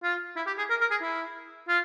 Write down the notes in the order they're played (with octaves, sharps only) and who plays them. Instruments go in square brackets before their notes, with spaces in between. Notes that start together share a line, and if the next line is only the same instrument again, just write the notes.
[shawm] F4
E4
G4
G#4
A#4
A#4
G#4
E4
F4